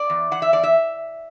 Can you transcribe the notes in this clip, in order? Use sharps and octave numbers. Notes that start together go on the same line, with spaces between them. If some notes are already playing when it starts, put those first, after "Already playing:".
Already playing: D5
E2
E3 F#5
E5
E2 D5
E5